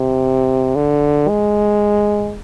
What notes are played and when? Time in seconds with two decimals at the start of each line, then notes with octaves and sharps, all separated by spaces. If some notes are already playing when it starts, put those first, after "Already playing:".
Already playing: C3
0.76 D3
1.28 G#3